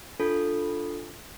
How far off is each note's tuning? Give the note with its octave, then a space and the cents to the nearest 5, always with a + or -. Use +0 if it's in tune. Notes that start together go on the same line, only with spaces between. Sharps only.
D4 +0 F4 +5 A4 +0